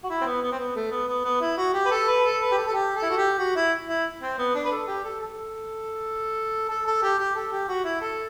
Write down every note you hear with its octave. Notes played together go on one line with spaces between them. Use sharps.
F#4
E4
C4
B3
B3
C4
B3
A3
B3
B3
B3
E4
F#4
G4
B4
A4
B4
A4
B4
G4
A4
A4
G4
A4
E4
F#4
G4
F#4
E4
E4
C4
B3
D4
B4
A4
G4
A4
A4
A4
A4
G4
G4
A4
G4
F#4
E4
A4